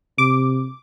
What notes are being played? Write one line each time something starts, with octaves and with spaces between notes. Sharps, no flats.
C3 D6